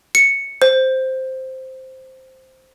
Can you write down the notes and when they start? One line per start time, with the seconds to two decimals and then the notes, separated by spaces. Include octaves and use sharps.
0.15 C#7
0.62 C5